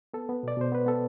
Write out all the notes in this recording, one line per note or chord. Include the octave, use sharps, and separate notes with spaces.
B3 A4
B3
B2 D5
B2 C5
B3 B4
B3 A4